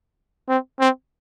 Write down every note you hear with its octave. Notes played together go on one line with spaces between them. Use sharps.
C4
C4